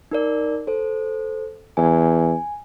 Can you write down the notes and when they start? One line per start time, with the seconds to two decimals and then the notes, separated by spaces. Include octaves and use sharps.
0.12 D#4 A#4 D5
0.67 A4 C5
1.77 E2 G#5